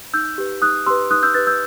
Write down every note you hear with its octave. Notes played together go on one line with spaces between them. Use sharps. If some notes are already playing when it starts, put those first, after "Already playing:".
D#4 E6 G6
G4 B4
D#4 D#6 F#6
G4 B4 C6 E6
D#4 D#6 F#6
E6 G6
G4 B4 F#6 A6
E6 G6